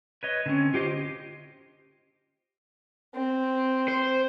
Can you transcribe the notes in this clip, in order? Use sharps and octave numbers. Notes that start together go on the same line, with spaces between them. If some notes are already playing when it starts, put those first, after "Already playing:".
B4 C#5 D#5
D3 C4 C#4
F4 G4 C5 D#5
C4
C5